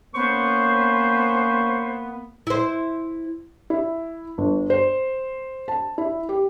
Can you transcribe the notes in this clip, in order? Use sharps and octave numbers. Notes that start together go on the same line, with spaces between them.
A#3 B3 C#4 C5 C#6
E4 C5
E4
G1
C5
A5
E4
G4